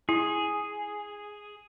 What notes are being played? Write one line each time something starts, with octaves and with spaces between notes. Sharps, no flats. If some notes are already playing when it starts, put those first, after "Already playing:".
E4 G#4